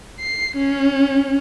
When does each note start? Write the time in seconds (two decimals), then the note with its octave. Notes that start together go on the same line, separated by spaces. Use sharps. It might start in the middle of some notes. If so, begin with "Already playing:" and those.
0.20 C7
0.57 C#4